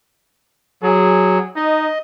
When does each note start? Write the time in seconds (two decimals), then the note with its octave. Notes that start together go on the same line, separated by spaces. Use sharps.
0.83 F#3 G#4
1.56 D#4 D#5